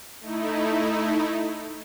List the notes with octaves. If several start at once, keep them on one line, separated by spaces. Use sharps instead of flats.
A3 D#4 E4